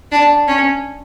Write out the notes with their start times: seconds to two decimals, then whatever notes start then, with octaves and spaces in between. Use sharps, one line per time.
0.12 D4
0.47 C#4